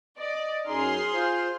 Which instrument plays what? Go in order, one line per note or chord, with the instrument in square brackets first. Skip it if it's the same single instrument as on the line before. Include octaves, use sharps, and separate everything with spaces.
[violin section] D5 [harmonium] D#5
[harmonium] F#2 D#4 [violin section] G#4 C6 F6
[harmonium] F4 C5